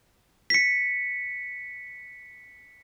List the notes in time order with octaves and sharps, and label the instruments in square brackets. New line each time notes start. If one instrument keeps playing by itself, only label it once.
[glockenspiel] B6 C#7